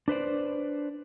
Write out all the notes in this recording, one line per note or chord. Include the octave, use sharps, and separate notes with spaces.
D4 B4 C5 D5